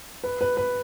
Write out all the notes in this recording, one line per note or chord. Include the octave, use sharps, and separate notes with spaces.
B4
B4
B4